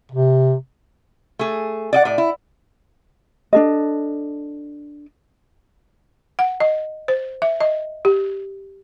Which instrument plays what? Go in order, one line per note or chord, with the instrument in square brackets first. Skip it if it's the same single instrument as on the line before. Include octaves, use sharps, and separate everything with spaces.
[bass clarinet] C3
[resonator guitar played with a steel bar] A3 G#4
D5 D#5 F#5
A2 D5
E4
[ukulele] D4 A4 D#5
[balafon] F#5
D#5
C5
E5
D#5
G4